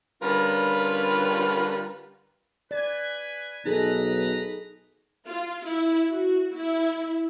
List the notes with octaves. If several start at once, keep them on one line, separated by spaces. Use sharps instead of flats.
D3 G3 C#4 F4 A#4 B4
B4 D5 G#5
B1 D#4 G#4 A4 B4 A#5
F4
E4
F#4
E4